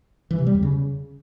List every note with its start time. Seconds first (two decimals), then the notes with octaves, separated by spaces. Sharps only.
0.31 E3
0.39 C3
0.47 G3
0.55 E2
0.63 C#3